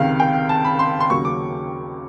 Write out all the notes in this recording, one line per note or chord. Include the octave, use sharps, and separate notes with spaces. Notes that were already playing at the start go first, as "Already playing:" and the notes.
Already playing: C#2 C3 D#3 F5
G5
A5
B5
C6
C6
D#2 C#3 F#3 A#3 C#6
D6